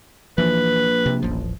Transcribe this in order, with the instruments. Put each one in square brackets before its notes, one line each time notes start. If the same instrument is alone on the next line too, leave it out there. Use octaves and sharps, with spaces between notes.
[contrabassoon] A#1 [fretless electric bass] E3 F3 [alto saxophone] B4
[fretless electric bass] C3
D#1 A1 F3